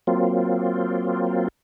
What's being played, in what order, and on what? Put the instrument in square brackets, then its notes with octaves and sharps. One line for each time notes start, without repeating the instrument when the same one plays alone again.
[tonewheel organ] F#3 A#3 C4 F4